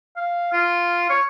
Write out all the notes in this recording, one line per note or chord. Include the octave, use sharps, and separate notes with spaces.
F5
F4
C#5